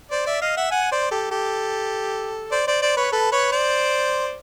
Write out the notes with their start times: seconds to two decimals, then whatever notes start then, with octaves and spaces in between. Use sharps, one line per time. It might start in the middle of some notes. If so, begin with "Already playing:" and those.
0.11 C5 D5
0.26 D5 E5
0.41 D#5 F5
0.57 E5 F#5
0.71 F#5 G#5
0.92 C5 D5
1.11 G4 A4
1.31 G4 A4
2.51 C5 D5
2.67 C5 D5
2.82 C5 D5
2.97 B4 C#5
3.12 A4 B4
3.32 B4 C#5
3.52 C5 D5